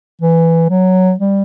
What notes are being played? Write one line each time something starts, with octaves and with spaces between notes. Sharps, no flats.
E3
F#3
G3